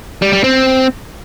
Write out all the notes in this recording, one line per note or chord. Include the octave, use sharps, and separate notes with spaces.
G3
G3
C4